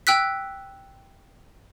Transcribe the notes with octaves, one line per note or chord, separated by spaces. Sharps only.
G5 E6 F#6 B6